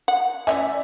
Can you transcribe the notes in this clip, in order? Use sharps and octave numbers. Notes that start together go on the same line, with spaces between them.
F#5
E3 C#4 D5 E5 G#5